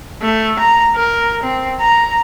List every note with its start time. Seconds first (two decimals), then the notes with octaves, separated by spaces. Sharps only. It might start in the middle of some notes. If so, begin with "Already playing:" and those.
0.22 A3
0.60 A#5
0.96 A#4
1.43 C4
1.80 A#5